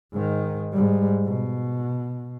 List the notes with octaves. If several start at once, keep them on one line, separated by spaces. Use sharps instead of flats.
G#2 D#3
G#2 G3
B2